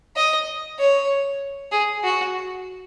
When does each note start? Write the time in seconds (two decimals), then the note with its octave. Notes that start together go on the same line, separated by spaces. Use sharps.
0.16 D#5
0.79 C#5
1.72 G#4
2.04 F#4